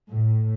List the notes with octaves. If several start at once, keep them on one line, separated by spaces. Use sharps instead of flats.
A2